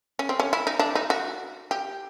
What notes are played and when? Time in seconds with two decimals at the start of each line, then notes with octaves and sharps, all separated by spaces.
0.19 C#4
0.29 C4
0.40 C#4
0.53 E4
0.67 D#4
0.79 D4
0.95 D#4
1.10 F#4
1.71 G4